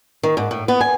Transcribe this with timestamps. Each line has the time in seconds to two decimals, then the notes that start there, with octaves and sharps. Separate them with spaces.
0.23 D#3
0.37 G#2
0.51 A2
0.68 B3
0.81 G#5